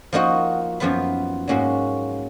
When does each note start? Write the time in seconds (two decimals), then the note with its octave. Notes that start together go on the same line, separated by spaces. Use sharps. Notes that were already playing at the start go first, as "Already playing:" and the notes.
0.13 F3 A#3 D#4 F#4
0.80 F#2 F3 B3 F4 B4
1.48 G#2 F#3 A#3 C#4 F#4